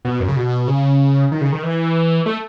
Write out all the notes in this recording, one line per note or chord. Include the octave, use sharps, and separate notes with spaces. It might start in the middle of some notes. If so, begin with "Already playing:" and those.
B2
F#2
C#3
B2
C#3
D#3
C#3
D#3
E3
A3